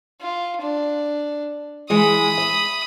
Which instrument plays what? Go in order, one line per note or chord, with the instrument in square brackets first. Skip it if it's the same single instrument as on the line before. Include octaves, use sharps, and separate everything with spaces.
[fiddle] F4
D4
[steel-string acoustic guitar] E3 G#3 [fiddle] B5 D#6
[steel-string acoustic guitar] E5